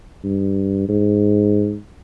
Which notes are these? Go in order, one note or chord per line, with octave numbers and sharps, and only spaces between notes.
G2
G#2